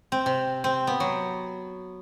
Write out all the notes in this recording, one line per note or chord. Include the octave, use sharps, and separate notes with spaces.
C4
C3
C4
B3
F#3